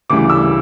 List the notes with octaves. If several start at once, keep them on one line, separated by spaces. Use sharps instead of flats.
D2 C#3 E3 G3 D6
E6